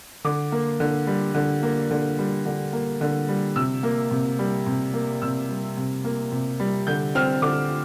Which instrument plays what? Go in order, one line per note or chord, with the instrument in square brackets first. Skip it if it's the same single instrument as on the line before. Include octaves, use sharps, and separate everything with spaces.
[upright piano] D3 D6
A#3
D3
G3
D3
A#3
D3
G3
D3
A#3
D3
G3
C3 E6
A#3
C3
G3
C3
A#3
C3 E6
G3
C3
A#3
C3
G3
D3 G6
C4 F6
D3 D6